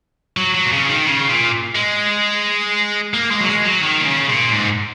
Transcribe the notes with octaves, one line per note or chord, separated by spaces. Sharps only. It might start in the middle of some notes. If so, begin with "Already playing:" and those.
F#3
F#3
A#2
C#3
D#3
C#3
A#2
G#3
A#3
G#3
F#3
G#3
F#3
D#3
A#2
C#3
A#2
G#2